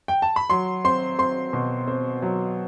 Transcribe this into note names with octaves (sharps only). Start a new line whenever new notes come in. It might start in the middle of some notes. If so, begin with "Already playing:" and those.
G5
A5
B5
F#3 C6
C4 C6
C4 C6
B2
C4
F#3